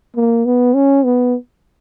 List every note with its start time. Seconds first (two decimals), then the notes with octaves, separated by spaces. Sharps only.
0.16 A#3
0.45 B3
0.74 C#4
1.04 B3